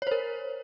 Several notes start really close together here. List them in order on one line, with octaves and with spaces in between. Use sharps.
C#5 C5 A#4